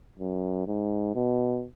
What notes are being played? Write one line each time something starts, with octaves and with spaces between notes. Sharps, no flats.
F#2
G#2
B2